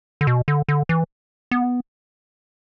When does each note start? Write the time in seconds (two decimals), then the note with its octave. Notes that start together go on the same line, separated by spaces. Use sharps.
0.21 D3
0.27 B2
0.48 D3
0.68 D3
0.89 E3
1.51 B3